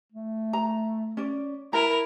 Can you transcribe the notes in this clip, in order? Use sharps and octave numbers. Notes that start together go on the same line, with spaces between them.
A3
A#5
C#4 D5
E4 A#4 A#5